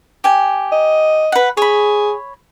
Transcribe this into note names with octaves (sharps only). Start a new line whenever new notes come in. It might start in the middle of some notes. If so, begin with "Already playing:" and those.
G4 G#5
D#5
B4 F#5
G#4 C#5 B5